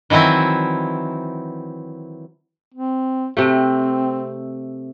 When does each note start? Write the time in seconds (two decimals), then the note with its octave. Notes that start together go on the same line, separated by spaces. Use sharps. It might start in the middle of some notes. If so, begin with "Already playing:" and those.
0.10 D#3 E3 F#3 C4 E4
2.74 C4
3.37 C3 A3 C4